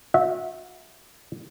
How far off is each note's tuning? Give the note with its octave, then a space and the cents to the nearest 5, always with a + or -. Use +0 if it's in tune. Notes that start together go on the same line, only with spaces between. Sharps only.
F#4 -40 E5 -15